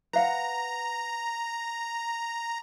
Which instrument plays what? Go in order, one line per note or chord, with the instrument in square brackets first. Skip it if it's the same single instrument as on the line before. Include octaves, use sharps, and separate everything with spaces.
[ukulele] B4 F5 F#5 [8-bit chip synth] A#5